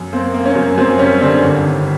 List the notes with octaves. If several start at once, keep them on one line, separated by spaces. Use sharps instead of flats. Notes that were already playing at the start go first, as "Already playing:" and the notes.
Already playing: F#2
A#3 C4
A#3
C#4
F#2
F#2 C4
G3 C#4
D3 C4 D4
G1
D#3